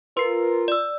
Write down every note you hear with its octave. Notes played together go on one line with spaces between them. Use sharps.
F4 A#4 B4 C7
D5 E6